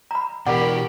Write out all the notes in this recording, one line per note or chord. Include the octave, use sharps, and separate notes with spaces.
A#5 B5
B2 E3 G4 A#4 D5 F#5 B5